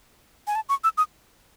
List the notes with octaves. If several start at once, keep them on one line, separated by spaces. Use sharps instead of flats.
G#5
A5
C#6
E6
D#6